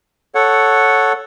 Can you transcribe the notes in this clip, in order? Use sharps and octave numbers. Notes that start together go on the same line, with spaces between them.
A4 C#5 F#5